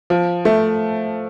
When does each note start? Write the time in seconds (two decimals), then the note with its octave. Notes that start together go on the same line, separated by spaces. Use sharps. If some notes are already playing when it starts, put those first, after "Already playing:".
0.10 F3
0.45 A3